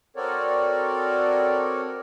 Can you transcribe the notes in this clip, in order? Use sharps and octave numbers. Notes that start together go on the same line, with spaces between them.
C4 F#4 A4 A#4 C#5 D5